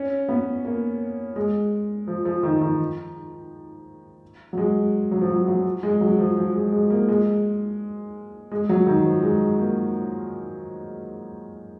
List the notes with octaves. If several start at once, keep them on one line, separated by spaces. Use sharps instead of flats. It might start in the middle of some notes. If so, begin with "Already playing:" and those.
Already playing: C#4
B3
A#3
G#3
F3
F3
D#3
D#3
F#3
G#3
F#3
F3
F#3
F#3
G#3
F#3
F3
F3
G#3
G#3
A#3
G#3
G#3
F#3
D#3
F3
G#3
A#3